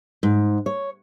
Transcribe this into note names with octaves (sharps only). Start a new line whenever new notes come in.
G#2
C#5